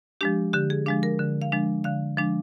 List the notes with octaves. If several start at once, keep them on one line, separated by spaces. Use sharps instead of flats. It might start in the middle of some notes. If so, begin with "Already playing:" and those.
F3 G#3 D4 G4
D3 G4
G#4
F3 G#3 D4 F5
A#4
D3
F5
F3 G#3 D4
D3 F5
F3 G#3 D4